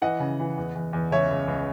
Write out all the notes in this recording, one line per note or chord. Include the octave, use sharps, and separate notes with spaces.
E3 D#5 F#5
C#3
E3
E2
E2
E2
C#2 C#5 E5
C#2
C#2